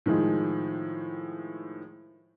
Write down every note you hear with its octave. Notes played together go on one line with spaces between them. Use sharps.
A2 D#3 F3 G#3